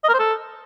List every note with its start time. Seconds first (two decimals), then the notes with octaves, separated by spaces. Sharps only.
0.04 D#5
0.09 A#4
0.14 C5
0.19 A4